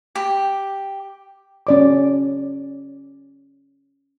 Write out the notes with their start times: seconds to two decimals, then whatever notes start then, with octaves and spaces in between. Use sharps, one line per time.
0.16 G4
1.67 C#4 D5 D6